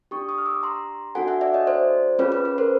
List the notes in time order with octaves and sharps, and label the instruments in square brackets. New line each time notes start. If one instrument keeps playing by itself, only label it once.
[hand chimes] D4 G4 C#6 D#6
C#6 D#6
F6
D6 E6
A#5 C6
D4 F#4 A4 F#5 G#5
E5 F#5
D5 E5
C#5 D#5
C5 D5
C#4 F4 G#4 B4 C#5
B4
B4
A#4 C5